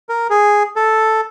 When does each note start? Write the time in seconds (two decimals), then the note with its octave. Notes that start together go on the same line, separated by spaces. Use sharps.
0.09 A#4
0.30 G#4
0.76 A4